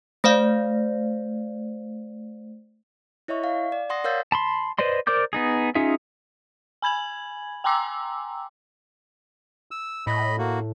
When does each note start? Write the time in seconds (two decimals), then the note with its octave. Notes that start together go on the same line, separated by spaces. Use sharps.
0.24 A3 C5 D5 F5
3.28 E4 C#5 D#5 E5 C#6
3.44 F5
3.72 D5
3.90 D5 F#5 C6 D#6 A#6
4.04 A#4 C#5 F5 E6 G6 A6
4.32 A5 B5 C6
4.79 B4 C5 D5 D#5 C6
5.07 A#4 C5 D5 D6 G6
5.33 B3 D#4 G#4
5.75 C#4 D#4 F4 G#4 E5
6.82 G#5 B5 G#6 F#7
7.64 G5 G#5 A#5 C6 D6 E6
9.71 E6
10.07 A2 D#5 B5
10.38 A#3 F#4